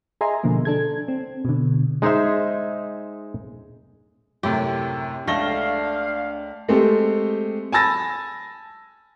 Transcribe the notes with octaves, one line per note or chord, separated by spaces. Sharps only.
G#4 D#5 E5 G#5 A#5 C6
B2 D3 F3 A#3
D4 A4 G#6
C4
B2 D3
G#3 D#4 G#4 C5 E5
F#2 A2 C3 G4
C#2 A3 D4 F5 A#6 G7
G#3 A3 C4 G4 A4
G#5 A5 B5 E6 A6 A#6